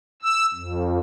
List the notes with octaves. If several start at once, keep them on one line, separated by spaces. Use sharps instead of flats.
E6
F2